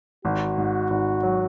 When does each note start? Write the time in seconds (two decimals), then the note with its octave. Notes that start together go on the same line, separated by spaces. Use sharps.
0.24 G#1 F#4
0.58 G#2
0.90 G#1
1.23 F#3